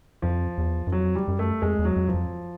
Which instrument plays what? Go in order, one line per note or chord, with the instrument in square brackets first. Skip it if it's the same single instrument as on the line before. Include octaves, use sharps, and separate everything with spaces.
[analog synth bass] F2 [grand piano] F3
[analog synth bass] E2
F#2
[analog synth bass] F2 [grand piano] F#3
[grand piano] G3
[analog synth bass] F#2
[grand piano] A3
[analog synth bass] F2 [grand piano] G#3
[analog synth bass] E2
[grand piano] F#3
[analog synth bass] F2
[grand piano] F3
[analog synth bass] F2